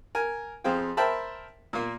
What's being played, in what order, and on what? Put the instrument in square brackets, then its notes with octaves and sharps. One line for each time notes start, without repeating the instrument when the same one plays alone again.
[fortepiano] A#4 G#5
F2 G#4 C5 F5 G5
A#4 C5 E5 G5 A5 B5
A#2 A#3